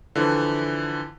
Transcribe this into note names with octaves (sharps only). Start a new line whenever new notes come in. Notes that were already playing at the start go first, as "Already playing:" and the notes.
D3 E3 F3